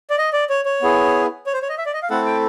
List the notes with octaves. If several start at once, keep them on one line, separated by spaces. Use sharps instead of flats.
D5
D#5
D5
C#5
C#5
B3 E4 G#4
C#5
C5
C#5
D#5
E5
D5
D#5
F5
A3 C4 E4 A4 F#5
G5